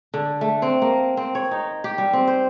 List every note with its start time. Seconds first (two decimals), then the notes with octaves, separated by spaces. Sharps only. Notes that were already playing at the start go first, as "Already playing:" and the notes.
0.14 D3
0.41 A3
0.62 C4
0.82 A#3
1.17 C4
1.35 C#5
1.51 D#4
1.84 G4
1.98 G3
2.13 C4
2.27 C5